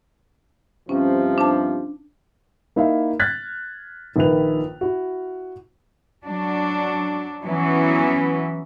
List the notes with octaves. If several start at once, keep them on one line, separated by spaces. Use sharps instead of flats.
G2 C3 F3 C#4
D4 A5
A#3 D#4 E4 E5 F5
F6 F#6 G#6 A6 B6
A#1 A#2 D#3 B4 F7
E4 F#4
F#3 D4
E3 F#3 B3 C#4 E4